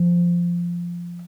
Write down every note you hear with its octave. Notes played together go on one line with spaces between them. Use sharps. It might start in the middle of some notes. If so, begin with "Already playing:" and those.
Already playing: F3